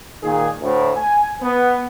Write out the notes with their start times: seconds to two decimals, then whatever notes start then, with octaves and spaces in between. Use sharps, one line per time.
0.22 A#2 D#3 G#4
0.62 D2 A2
0.96 G#5
1.42 B3